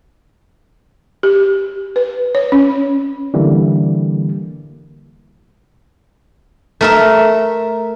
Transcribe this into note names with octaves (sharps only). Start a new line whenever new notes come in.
G4
B4
C#5
C#4
D3 E3 G3 A#3
A3 A#4 E5